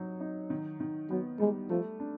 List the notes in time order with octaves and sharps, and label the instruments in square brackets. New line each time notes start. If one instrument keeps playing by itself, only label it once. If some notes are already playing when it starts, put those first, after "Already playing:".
Already playing: [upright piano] F#3 D#4
D#4
D#3
D#3
[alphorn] F#3 [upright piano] B3
[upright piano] G3 [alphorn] G#3
[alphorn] F3 [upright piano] A3
[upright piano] D4